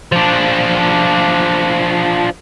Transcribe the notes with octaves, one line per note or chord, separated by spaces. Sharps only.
F3 D4